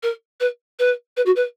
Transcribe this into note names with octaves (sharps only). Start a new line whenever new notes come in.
A#4
B4
B4
B4
F#4
B4